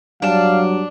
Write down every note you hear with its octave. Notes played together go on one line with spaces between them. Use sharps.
G2 F#3 D4 F5 A5